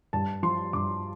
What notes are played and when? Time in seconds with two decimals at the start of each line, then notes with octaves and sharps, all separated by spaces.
0.13 G2 A5
0.43 F3 C6
0.73 G2 D6